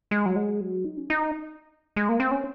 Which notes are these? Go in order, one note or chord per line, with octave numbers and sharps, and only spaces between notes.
G#3
F#3
G#3
F#3
D#4
C#4
D#4
G#3
A#3
C4
C#4